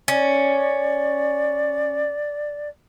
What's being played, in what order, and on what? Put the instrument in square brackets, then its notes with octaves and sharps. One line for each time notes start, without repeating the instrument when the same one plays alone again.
[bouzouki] C#4 [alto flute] D5